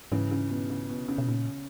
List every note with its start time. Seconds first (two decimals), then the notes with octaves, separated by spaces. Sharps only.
0.12 G#2 C#3 E3
0.31 C#3
0.50 B2
0.70 C#3
0.89 B2
1.08 C#3
1.18 B2
1.28 A#2 C#3